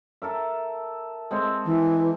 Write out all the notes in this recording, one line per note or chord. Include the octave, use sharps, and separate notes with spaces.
A4 A#4 E5
G#3 C4 A4
E3